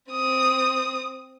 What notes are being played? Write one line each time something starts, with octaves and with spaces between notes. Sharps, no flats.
C4 D#6